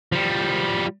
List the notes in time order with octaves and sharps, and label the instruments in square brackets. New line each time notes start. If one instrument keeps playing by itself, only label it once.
[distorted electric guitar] F3 G3